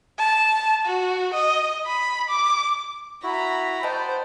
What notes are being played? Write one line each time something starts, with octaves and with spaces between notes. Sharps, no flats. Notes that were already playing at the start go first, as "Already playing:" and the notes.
A5
F#4
D#5
B5
D6
E4 F#4 A#5 B5
C5 D#5 F#5 G5 A5 B5